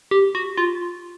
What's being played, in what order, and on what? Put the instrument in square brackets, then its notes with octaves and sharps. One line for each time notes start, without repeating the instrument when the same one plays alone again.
[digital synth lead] G4
F#4
F4